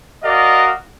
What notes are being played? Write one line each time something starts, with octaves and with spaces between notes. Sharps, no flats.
F#4 A#4 D5 D#5 F5